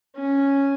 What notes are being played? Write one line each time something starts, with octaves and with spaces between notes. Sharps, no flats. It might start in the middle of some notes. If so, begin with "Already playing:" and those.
C#4